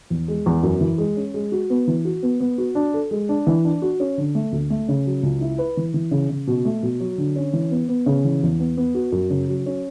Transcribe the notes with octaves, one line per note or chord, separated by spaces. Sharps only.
E2
G#3
E2
F#2
E3
G#3
C#4
G#3
F#4
B3
E3
F#4
B3
B3
F#4
D4
A4
G#3
D4
E3
D4
F#4
C#4
D3
A3
D2
A3
C#3
F#3
C#2
E4
B4
E3
E3
C#3
C#3
B2
A3
B2
F#3
D3
C#4
E3
B3
B3
C#3
E3
E2
B3
B3
F#4
F#2
C#3
F#3
C#4